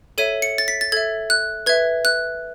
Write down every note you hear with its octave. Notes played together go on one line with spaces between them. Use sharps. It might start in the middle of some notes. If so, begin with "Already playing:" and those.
A4 C#5 E5 D#7
C#7
A6
B6
A6
A4 E5 G#6
F#6
B4 E5 G#6
F#6